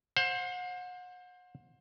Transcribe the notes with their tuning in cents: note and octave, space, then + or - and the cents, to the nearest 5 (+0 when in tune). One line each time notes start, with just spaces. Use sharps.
C5 +20 F#5 -35